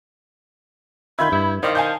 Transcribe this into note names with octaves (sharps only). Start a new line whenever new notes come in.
D#3 F4 E5 B5 G6 G#6
G2 E4
D#3 C5 D5 F5
F5 G#5 A5 G6